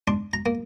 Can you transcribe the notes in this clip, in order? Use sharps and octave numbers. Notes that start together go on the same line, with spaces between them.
D4 C6
A#5
A#3